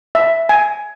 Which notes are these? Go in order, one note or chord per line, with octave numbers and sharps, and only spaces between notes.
E5
G#5